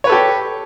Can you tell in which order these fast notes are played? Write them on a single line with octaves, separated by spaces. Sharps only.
C#5 B4 A4 G4